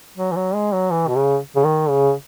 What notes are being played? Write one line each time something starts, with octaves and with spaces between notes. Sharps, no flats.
F#3
E3
F#3
G#3
F#3
E3
B2
C#3
C#3
D#3
C#3